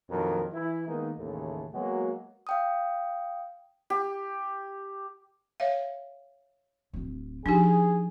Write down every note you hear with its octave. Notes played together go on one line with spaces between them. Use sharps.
A#1 F2 D#3 F#3 A#4
E3 E4
D#3 G#3 A#3 B3 D#4
A1 D#2 C#3 A3
F#3 G#3 A#3 B3 F#4
F5 G5 D#6
G4
C#5 E5 F5
D1 C4
F3 D4 D#4 G4 G#4